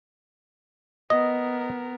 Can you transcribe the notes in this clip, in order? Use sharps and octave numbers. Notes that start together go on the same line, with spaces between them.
B3 A#4 D#5